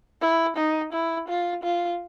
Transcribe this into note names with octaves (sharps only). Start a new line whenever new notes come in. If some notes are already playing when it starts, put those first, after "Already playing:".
E4
D#4
E4
F4
F4